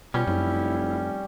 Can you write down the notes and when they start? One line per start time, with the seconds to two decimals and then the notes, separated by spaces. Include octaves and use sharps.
0.14 B2 G3 C#4 F4
0.27 F1 F#2 E4